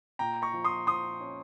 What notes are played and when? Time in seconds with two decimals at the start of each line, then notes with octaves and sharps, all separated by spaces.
0.19 A#2 G5 A#5
0.42 A#5 C#6
0.53 F3
0.64 C6 D#6
0.87 F3 C6 D#6
1.21 C#4